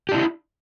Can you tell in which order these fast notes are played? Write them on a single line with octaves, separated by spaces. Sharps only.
G4 D4 E4